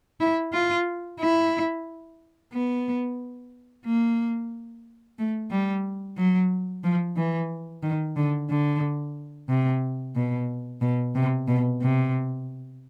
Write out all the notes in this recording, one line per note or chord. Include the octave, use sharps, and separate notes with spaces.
E4
F4
E4
B3
A#3
A3
G3
F#3
F3
E3
D#3
D3
D3
C3
B2
B2
C3
B2
C3